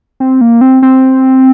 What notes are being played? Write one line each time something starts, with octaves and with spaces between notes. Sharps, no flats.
C4
A#3
C4
C4